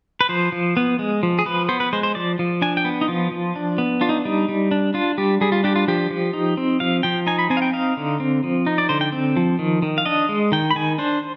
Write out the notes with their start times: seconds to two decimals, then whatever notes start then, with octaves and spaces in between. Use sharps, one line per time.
0.21 B4
0.29 F3 C5
0.52 F3
0.77 B3
0.99 G#3
1.23 F3
1.39 G#4
1.46 F3 B4
1.69 B3 C5
1.80 B4
1.93 G#3 C5
2.03 C5
2.15 F3 D5
2.39 F3
2.62 D4 G#5
2.77 G5
2.85 B3
3.01 D#4
3.08 F3 F4
3.31 F3
3.56 D4
3.78 B3
4.01 D4 F4
4.09 D#4
4.25 G3 D#4
4.49 G3
4.71 D4
4.94 D4 F4
5.18 G3 G4
5.41 G3 G#4
5.52 F4
5.64 D4 G4
5.76 F4
5.88 F3 G4
6.10 F3
6.33 D#4
6.57 C4
6.80 F3 F5
7.03 F3 G5
7.27 D#4 G#5
7.39 B5
7.50 C4 G#5
7.57 F5
7.62 G5
7.73 D#4 F5
7.97 D3
8.20 C4
8.44 F3
8.66 D#4
8.78 D5
8.89 D3 C5
9.01 G5
9.12 C4
9.36 F3
9.59 D#3
9.82 D#3
9.98 F5
10.06 D4 D#5
10.29 G#3
10.52 D#3 G5
10.71 B5
10.76 D#3 G#5
10.98 D4 C5